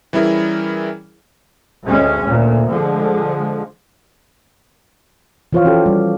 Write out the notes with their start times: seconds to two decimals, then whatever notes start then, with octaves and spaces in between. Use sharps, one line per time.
0.13 E3 G3 C#4 E4 G#4 A#4
1.85 D2 G#3 C#4
2.25 D2 A#2
2.69 D3 F3 G#3
5.53 E3 F3 F4 C5 C#5 F5
5.65 C#4 F#4 G4 A4
5.86 G3